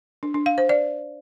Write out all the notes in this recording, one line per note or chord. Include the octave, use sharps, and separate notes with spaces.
D4
D4
F5
C5
D5